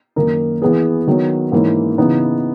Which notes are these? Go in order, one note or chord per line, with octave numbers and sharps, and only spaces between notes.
F#2 D#3 A#3 D#4 A#4
E3 B3 E4 G#4 B4
D#3 F#3 B3
G#2 E3 A#3 C#4
C#3 E3 B3 D#4